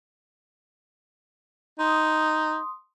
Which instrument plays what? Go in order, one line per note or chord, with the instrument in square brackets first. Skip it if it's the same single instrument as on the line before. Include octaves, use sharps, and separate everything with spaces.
[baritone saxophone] D#4 [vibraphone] C6 D#6